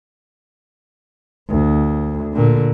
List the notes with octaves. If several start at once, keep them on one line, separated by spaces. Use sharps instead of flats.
D2
A#2 D3